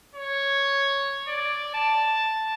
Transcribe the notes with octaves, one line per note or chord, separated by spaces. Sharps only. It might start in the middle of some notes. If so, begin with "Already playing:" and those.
C#5
D5
A5